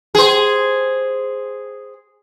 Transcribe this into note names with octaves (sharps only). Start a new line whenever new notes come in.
G#4 C5